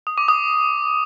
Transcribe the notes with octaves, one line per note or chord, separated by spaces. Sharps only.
D#6
D6
D#6